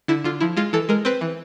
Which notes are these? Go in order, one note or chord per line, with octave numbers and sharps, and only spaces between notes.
D3 E4
D3 F4
F3 E4
G#3 F4
E3 A4
G#3 A#4
C4 B4
E3